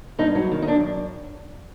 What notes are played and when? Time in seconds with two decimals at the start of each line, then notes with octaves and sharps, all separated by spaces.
0.19 G2 D#4
0.35 F#3
0.52 D#3
0.62 D#4
0.67 F#2 D4